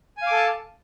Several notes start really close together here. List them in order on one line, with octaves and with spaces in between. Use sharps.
G#5 F5 D6 A4 A5